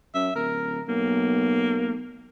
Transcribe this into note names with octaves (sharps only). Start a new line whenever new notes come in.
F#2 E5
D1 A#4
B1 A#3